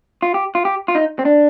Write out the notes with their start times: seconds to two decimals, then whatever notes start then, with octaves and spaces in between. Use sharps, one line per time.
0.22 F4
0.34 G4
0.55 F4
0.65 G4
0.88 F4
0.95 D#4
1.19 C4
1.25 D4